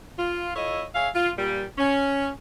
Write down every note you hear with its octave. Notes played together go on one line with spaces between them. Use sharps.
F4
E4 F4 A4 C#5 D#5
G#4 C#5 E5 F5
F4
A#2 G3
C#4